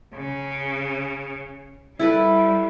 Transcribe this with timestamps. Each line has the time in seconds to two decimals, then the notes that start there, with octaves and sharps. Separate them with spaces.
0.14 C#3
1.99 G3 E4 A4 B4